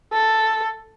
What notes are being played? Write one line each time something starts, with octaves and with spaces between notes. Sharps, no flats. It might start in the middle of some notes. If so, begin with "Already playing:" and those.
A4